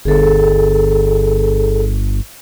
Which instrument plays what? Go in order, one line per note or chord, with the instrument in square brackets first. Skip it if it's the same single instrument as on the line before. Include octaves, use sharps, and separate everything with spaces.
[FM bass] G1 [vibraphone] G#4 A4